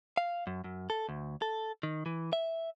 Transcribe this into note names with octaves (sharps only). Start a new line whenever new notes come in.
F5
F#2
F#2
A4
D2
A4
D#3
E3
E5